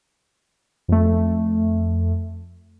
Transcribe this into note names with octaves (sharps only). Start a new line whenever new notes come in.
F2 A3